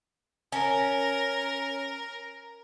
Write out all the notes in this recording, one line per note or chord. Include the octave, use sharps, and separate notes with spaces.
C#4 A#4